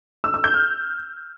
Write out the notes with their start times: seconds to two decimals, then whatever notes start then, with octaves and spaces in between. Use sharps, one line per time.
0.24 E6
0.34 E6
0.44 G6
0.54 F6